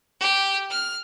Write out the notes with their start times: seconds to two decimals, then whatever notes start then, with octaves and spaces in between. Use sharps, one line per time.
0.20 G4
0.71 F6